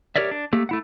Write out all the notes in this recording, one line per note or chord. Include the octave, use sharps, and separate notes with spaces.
G4 A#4 C#5 D5 E5
D4
A3 A#3 G4
A3 E4 F#5